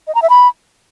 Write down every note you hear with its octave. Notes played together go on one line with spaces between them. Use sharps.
D#5
A#5
E5
B5